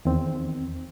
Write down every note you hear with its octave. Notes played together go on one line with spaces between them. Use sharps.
E2 D#3 C4